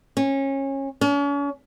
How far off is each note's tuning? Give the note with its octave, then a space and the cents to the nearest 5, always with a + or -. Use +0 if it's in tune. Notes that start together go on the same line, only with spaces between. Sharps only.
C#4 -25
C#4 +40